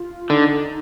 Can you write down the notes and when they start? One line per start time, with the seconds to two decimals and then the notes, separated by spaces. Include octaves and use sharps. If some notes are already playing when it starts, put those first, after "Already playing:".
Already playing: F4
0.30 D3 D#4